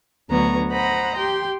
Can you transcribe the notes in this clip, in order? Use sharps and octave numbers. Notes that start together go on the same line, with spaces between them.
D2 D3 F#3 B3 A#5 C#6
C5 D#5 F#5 A#5 B5
G4 G5 C6